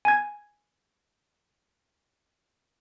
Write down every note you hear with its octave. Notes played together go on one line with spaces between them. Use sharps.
G#5 G#6